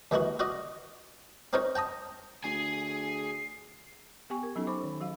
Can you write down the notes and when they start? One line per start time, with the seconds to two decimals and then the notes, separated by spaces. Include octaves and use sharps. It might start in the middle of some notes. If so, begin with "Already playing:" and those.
0.11 D#2 E3 G#3 A#3 E4 F#4
0.39 F4 F#4 D5 D#5
1.53 C4 D#4 F4 A#4 C5 C#5
1.75 G5 A5 A#5 D#6
2.44 D2 G#4 G#5 C7
4.30 B3 G4 G5 G#5 C#6
4.43 A#4
4.56 F#3 B3 C#4 D#4 F#4 A4
4.67 C5 B5 C#6 D6
4.83 D#3
5.00 F#3 F#4 F5